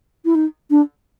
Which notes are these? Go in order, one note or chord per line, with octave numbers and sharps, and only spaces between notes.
E4
D#4
D4